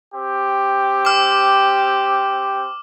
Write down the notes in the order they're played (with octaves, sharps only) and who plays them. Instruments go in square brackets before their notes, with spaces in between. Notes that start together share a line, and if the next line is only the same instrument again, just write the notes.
[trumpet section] C4 G4
[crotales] D6 F6